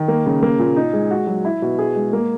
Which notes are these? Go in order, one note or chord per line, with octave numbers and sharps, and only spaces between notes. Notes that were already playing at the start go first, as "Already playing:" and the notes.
Already playing: D#3
A#3
C#3
A#3
A#2
D#4
G#3
F#4
F#3
E4
B2
G#4
G#3
A#3